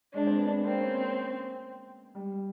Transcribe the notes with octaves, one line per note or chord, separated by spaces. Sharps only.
G#3 D4
C4
B3
A#3 C4
C#4
G3